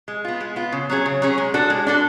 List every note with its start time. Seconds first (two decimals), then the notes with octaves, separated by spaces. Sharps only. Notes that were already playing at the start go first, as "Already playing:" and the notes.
0.08 G#3
0.25 B3 F4
0.40 G#3
0.56 B3 F4
0.72 C#3
0.90 F#3 C#4 G#4
1.06 C#3
1.22 F#3 C#4 G#4
1.38 G#3
1.54 D4 F#4 A4
1.70 G#3
1.87 D4 F#4 A4